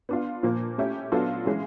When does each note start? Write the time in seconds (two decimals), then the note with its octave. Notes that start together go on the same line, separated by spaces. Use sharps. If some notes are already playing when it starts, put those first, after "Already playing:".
0.09 B3 D4 F4
0.43 A#2 F3 A#3
0.78 A3 C#4 E4 G4
1.12 F#3 B3 D4 F4 A4
1.46 E3 G#3 C#4 F4